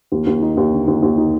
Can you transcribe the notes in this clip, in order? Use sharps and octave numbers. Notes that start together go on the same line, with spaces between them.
D#2
D#2
D#4
D#2
D3
D#2
D#2
D#4